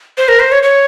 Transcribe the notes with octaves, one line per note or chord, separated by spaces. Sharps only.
C5
A#4
C5
C#5
C#5